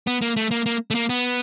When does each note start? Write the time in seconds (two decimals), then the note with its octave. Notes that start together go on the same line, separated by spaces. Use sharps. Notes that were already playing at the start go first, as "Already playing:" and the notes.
0.07 B3
0.22 A#3
0.36 A3
0.51 A#3
0.66 A#3
0.91 A3
0.95 A#3
1.09 B3